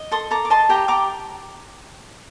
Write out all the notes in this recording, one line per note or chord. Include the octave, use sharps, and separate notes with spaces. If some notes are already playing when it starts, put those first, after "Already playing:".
Already playing: D#5
A4 C6 D#6
A4 A#5 D6
D6
D#5 A5 C6
G4 G5 A#5
G4 A#5 D6